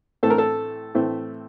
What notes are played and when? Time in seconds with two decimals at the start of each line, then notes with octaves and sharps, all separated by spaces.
0.23 A2 E3 A3 C4 A4
0.30 A#4
0.38 A4
0.95 A2 E3 A3 C4